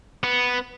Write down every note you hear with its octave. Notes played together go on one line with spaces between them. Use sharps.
B3